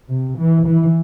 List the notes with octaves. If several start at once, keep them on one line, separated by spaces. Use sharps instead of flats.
C3
E3
E3